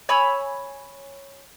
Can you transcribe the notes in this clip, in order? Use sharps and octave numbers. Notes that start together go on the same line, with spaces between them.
C#5 G#5 B5 E6